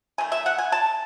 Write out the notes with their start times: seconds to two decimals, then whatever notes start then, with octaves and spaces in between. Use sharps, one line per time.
0.18 D#3 A3 G#5
0.32 E5
0.46 F#5
0.58 G#5
0.72 A5